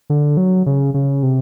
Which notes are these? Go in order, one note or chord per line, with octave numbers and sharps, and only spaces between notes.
D3
F#3
C#3
C#3
C3